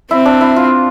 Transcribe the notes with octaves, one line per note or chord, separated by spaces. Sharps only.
C4 E4
D4
E4
F4